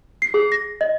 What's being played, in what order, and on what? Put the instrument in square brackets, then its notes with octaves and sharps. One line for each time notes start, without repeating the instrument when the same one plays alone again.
[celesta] C7
G#4
A#6
D#5